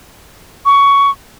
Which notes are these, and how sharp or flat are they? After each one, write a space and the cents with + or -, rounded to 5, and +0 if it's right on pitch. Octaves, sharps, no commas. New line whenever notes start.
C#6 +15